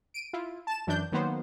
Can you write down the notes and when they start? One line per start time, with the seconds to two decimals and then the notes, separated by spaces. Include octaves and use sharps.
0.14 D7 D#7
0.33 E4 F4
0.67 A5 E7
0.87 F#2 E3 D4 G6
1.12 D#3 F#3 A#3 B3 C5